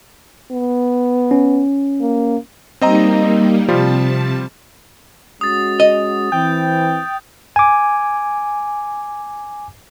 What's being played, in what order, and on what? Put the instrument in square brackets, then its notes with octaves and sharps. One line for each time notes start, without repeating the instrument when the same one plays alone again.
[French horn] B3
[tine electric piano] C#4
[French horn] A#3
[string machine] G3 A#3 D#4 [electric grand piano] C4 D#5 A#5
[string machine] C3 A5 [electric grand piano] F3 G3 F4
[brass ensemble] G#3 C#4 F#4 [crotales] D#6 A6
[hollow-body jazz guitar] D#5
[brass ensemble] E3 C4 [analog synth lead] G5 [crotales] G6
[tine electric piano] G#5 D6